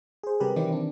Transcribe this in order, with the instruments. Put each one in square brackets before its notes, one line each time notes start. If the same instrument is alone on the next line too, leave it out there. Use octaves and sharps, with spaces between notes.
[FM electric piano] G#4 C5
C3 G3 G4 A#4 B4
D#3 E3 C4 E4 G4 D5
D4